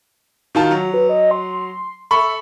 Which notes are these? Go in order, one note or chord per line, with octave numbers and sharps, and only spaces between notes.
D#3 F4 F#4 A5
F#3
B4
D#5
C6
A4 E5 B5 C#6